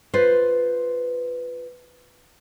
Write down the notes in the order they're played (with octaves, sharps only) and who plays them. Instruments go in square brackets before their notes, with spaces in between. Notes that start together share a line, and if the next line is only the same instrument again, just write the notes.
[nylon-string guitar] F4 B4 C5